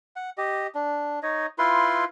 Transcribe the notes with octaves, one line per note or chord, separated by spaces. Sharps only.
F#5
G4 D#5
D4
D#4 C#5 D#5
E4 F4 B4 C6